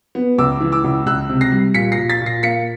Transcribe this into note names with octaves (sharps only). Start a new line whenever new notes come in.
B3
C#2 D6 E6
E3
D6 E6
C#2
C#2 E6 F#6
C3
A#6 C7
G3
A#2 B6 C#7
A#6 C7
A#2
A6 B6
A#2
A#6 C7
A#3 B6 C#7